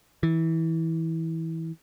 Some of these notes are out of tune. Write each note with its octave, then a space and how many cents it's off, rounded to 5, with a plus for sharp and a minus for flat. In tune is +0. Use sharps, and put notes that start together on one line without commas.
E3 -20